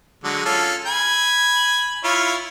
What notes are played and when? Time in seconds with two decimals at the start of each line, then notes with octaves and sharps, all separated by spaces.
0.24 D3 F#3 G#3
0.46 C#4 F4 A4
0.86 G#5 B5
2.04 E4 F4 C#5